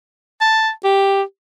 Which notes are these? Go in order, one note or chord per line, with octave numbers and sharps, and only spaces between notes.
A5
G4